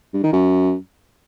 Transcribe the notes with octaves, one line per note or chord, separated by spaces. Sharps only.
G2
D#3
F#2